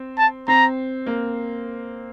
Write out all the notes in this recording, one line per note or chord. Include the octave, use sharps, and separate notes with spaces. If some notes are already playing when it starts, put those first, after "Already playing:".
Already playing: C4
A5
C4 A#5
A#3